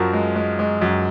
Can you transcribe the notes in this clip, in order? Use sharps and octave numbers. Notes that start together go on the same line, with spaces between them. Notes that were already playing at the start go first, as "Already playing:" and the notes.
Already playing: F#2 F3 F#4 A#4
G#3
G#3
G#3
F#2